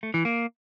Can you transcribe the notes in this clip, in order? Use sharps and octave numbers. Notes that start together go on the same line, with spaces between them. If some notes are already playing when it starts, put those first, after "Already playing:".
A3
E3
A#3